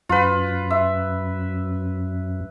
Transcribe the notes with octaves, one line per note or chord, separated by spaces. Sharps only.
F#2 F4 B4
E5